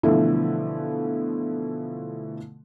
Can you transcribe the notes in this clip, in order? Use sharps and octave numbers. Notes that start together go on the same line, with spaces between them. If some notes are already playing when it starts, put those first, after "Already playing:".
B2 D3 E3 F3 A3 E4